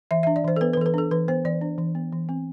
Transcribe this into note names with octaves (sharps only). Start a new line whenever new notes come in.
E3 E5
D4 E5
D5
E3 C5
A4
B3 B4
B4
E3 A4
B4
D4 A4
E3 B4
B3 C5
E3 D5
D4
E3
B3
E3
C4